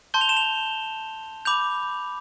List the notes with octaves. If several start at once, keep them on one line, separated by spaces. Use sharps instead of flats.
A5 C6 G6 G7
F7
E7
F7
B5 D6 G6 F7